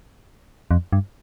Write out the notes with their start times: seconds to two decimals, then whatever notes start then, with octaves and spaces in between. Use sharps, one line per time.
0.71 F2
0.93 G2